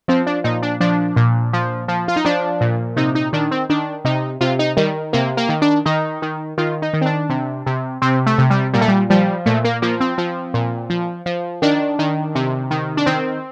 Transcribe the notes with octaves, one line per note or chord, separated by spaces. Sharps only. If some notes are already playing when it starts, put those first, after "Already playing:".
F3 C4
D4
A#2 D#4
D4
F3 D4
A#2
F3
F3
F4
D#4
F3 D4
A#2
C3 D#4
D#4
D#3 D4
C4
D#3 D4
C3 D#4
C3 F4
D#4
D#3 G3
C3 A#3
A#3
D#3
D4
D#3 D#4
D#3
D#3 F4
D#4
D#3
C4
D4
C3
C3
C3 C4
A3
C3
G3
A#2 G3
A3
G3
F3 G3
A#2 A3
A#3
F3 A#3
C4
F3
A#2
F3
F3
D#3 D4
D#3
C3
D#3
D4
D#3 C4